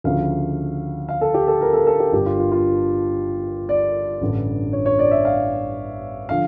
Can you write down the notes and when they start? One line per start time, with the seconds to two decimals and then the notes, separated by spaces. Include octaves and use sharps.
0.04 D2 C#3 F3 F5
1.09 F5
1.21 A4
1.34 G4
1.48 A4
1.61 A#4
1.73 A4
1.87 A4
2.00 G4
2.12 G1 G2 D3 G4
2.26 F4
2.39 F4
2.52 F4
3.69 D5
4.21 A1 G2 D3
4.73 C#5
4.86 C#5
4.99 D5
5.11 E5
5.25 F5
6.29 D3 F3 F5